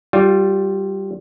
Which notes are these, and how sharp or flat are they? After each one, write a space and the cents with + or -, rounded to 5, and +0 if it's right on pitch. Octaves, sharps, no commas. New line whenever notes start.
G3 -15 F4 +20